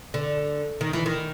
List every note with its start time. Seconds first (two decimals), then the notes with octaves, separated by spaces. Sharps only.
0.14 D3
0.81 D#3
0.93 E3
1.06 D#3